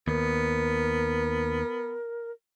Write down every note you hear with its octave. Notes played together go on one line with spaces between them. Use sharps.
D#2 B3 A#4